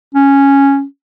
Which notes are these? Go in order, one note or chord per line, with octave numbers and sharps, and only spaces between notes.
C#4